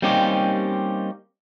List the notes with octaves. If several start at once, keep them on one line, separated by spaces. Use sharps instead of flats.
G3 A#3 C4 C#4 D#4 G4